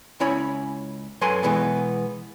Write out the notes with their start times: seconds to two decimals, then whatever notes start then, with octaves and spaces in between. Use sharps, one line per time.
0.20 C#2 C#4 E4 C#5 B5
1.21 F#2 F#3 A4 B4 G#5 C6
1.43 B2 E3 G#3 B3